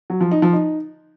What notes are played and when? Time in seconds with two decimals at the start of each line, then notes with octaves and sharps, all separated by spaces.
0.10 F#3
0.21 F3
0.31 D#4
0.42 F3
0.53 D#4